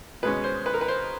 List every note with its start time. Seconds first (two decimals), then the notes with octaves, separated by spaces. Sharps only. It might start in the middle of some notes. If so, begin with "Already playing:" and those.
0.23 B2 G#3 C#4 B4
0.44 C5
0.66 B4
0.74 A#4
0.81 B4
0.88 C5